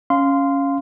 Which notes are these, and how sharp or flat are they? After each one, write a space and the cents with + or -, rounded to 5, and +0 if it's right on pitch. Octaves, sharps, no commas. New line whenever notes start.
C#4 +0 F5 +0 C6 -15